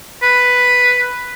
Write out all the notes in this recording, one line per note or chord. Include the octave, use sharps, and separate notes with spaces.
B4